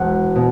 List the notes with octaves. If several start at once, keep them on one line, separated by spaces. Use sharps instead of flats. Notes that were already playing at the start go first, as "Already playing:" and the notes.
Already playing: E1 F#5
B2